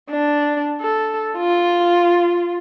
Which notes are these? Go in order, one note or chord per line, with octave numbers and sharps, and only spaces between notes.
D4
A4
F4